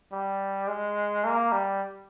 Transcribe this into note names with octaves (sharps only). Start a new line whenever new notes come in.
G3
G#3
A#3
G3